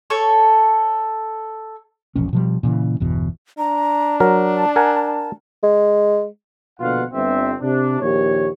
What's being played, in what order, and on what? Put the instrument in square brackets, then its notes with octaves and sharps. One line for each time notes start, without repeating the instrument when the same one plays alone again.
[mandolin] A4 C#5 C#6
[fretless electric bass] E1 A#1 C#4
B2 F3 G3
A#2 C#3 E3
G1 E2 B2
[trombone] D4 [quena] A#5
[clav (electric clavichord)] F#3 A#4 [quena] A5
[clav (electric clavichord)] A#4 F#5 G#5
[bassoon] G#3
[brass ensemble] A#1 B2 D3 F4 F5 F#5
G1 C4 E5
C3 D4
A#1 D#2 G4 C#5